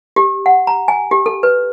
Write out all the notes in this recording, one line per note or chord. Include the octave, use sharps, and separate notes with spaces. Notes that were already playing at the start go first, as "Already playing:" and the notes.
G4
F#5
A#5
G#5
G4
A4
B4